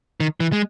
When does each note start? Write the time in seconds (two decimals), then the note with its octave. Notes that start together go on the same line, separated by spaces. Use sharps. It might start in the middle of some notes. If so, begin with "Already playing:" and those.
0.20 D#3
0.40 E3
0.52 G#3